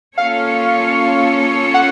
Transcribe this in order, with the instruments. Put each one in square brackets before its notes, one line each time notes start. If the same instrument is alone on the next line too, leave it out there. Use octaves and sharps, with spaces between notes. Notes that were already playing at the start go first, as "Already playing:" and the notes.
[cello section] A#3 C#4 F4 A4 C#5 [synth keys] F5
[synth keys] F#5